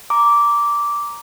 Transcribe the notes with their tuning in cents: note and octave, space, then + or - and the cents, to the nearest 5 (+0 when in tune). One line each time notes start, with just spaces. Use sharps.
A#5 +0 D6 -10